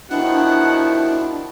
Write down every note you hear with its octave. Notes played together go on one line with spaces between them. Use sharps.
B2 D#3 F3 D4 E4 F#5